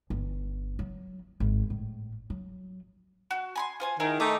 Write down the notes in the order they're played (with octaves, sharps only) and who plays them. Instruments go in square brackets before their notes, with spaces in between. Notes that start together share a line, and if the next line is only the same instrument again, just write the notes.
[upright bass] G1
F#3
G#1
A2
F#3
[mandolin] F#4
G#5 B5 C6
F4 C5 G#5
[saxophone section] D#3 [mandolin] E4 G#4 A#4
[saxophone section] A3 D#4 [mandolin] G4 D6